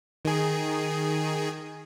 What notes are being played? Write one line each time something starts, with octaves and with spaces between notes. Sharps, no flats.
D#3 G#4